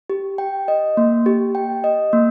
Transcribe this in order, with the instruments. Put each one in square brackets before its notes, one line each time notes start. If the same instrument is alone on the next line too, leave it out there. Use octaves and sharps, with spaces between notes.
[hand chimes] G4
G5
D#5
A#3
G4
G5
D#5
A#3